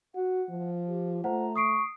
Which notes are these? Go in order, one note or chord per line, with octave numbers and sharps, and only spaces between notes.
F#4 F#5
F3
G4
A3 F4 C5 F#5 A#5
C#6 D#6 C7 D7